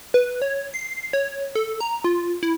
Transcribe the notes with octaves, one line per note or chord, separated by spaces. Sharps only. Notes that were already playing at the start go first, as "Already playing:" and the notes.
B4
C#5
C7
C#5
A4
A#5
F4
E4